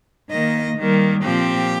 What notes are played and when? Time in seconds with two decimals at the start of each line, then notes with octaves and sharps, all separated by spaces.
0.30 D#3 A#3 D#5
0.77 D#3 G3 A#3
1.23 A#2 F3 C4 G4